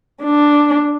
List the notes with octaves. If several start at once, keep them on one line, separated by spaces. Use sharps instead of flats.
D4